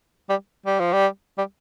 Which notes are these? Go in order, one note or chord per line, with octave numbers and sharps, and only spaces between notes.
G3
G3
F3
G3
G3